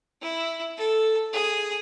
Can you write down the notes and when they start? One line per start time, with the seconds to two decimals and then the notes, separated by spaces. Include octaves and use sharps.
0.22 E4
0.77 A4
1.33 G#4